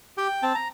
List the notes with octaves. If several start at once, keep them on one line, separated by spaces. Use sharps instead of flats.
G4 G5
C4 A5
A#5